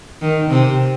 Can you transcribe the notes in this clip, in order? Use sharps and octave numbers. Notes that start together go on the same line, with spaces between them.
D#3
C3